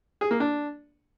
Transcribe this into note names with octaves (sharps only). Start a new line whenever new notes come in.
G#4
A#3
D4